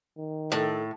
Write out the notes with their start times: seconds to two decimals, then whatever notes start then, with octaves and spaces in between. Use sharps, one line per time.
0.18 D#3
0.52 A2 A4